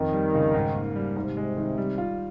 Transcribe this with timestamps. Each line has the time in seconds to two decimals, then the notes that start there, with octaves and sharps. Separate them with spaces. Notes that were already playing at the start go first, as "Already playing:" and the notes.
Already playing: F2 D#3
0.13 G3
0.34 C#3
0.54 G#2
0.75 A#3
0.96 G3
1.16 G#2 C3
1.37 G#3
1.57 D#3
1.78 G3
1.98 F4